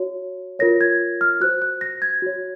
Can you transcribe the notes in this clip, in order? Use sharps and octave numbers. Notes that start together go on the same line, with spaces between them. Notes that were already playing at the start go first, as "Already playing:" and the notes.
Already playing: F#4 C#5
F4 A#4 C#5 A#6
G#6
F6
F#4 C5 F#6
F#6
A#6
G#6
F#4 C#5